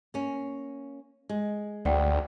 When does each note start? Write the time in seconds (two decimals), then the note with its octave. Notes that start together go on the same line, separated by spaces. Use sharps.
0.14 A#3 C#4
1.29 G#3
1.85 D2 D5 F#5 G5